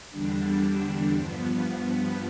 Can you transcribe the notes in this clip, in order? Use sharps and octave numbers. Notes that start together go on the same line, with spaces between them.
E2 D3 G3 D4
G2 F3 B3